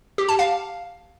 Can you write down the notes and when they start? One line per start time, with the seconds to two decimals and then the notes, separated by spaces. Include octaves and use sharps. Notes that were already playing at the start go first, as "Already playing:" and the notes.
0.18 G4
0.29 A5
0.39 F5